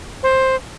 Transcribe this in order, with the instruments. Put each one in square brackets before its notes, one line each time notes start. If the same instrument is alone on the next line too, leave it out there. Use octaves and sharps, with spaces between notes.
[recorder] C5